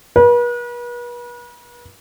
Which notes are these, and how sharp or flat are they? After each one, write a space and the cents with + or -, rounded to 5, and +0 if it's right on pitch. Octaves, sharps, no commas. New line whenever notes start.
B4 -40